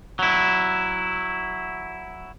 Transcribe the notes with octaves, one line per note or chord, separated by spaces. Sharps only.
F#3 E4